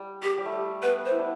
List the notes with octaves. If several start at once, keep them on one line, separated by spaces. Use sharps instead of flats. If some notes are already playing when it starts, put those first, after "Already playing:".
Already playing: G3
G4
G3
A3
G3
B3 B4
C5
E4
D4